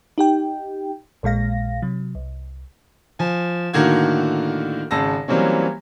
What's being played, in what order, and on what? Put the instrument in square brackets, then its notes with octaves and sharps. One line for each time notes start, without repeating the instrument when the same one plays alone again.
[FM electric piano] D#4 G4 G5
A#1 A#2 G#3 F5 A#6
C3 F#3
C2
[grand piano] F3 G#5
A2 D3 D#3 A#3 F#4 G#6
G#1 C#3 A5 E6 A#6
E3 F#3 G3 A#3 C4 C#4